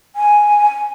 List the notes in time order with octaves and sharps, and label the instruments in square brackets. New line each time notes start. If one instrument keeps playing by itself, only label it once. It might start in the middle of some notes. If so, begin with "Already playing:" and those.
[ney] G#5